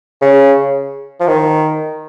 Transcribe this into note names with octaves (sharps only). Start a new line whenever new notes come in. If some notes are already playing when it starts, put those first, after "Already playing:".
C#3
F3
D#3